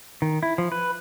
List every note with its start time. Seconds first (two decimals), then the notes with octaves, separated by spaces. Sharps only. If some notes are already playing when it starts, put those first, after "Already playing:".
0.22 D#3
0.43 E4
0.58 F3
0.72 B4